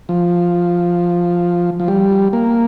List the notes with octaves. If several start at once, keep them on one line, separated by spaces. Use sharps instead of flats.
F3
F3
G3
A#3